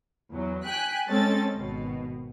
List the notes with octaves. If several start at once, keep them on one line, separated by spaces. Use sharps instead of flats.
E2 F#3
G5 G#5 F#6 B6
G#3 C4 C#4 A4 D#5 A6
G#1 B2